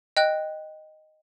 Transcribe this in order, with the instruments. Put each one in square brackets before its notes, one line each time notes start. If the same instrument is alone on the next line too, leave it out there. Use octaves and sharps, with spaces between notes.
[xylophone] D#5 G5 F#6